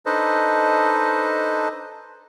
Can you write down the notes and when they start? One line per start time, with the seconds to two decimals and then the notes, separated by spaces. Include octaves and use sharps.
0.06 D4 D#4 A4 B4 C5 D#5